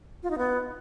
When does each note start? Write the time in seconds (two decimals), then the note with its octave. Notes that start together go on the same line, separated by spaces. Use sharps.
0.23 F4
0.30 D#4
0.38 B3